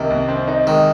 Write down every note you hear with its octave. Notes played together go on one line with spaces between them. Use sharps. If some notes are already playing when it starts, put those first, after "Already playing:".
Already playing: C2 C3 D#3 A#3
C2
C4
D#4
D#3 G#3